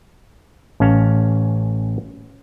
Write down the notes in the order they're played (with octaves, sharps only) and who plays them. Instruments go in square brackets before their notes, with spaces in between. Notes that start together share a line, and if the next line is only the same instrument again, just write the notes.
[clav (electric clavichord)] A1 C#4 F5 A5